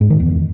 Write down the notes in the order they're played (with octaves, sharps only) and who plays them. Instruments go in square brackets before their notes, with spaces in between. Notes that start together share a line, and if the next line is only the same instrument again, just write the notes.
[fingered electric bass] G#2
D#3
E2